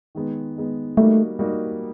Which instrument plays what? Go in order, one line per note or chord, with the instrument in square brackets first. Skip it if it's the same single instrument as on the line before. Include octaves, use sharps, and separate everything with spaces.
[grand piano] D#3 G#3 B3
D#3 G#3 B3
[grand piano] G3 A#3 D#4 F#4 [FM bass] A3
[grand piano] G3 A#3 D#4 F#4